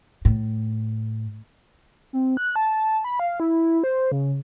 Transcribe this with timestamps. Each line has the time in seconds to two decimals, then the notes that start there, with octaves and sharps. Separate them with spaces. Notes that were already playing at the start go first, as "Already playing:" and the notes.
0.25 A2
2.13 C4
2.37 F#6
2.56 A5
3.04 B5
3.20 F5
3.40 E4
3.84 C5
4.12 C#3